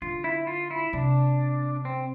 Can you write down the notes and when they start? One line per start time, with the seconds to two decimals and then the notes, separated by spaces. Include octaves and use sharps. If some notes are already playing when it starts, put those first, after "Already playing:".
0.02 D3 F4
0.24 E4
0.47 F4
0.71 E4
0.93 C3 D4
1.85 C4